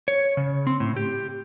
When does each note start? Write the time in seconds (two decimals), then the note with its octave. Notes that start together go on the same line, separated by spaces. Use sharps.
0.08 C#5
0.37 C#3
0.67 C4
0.80 A2
0.96 G4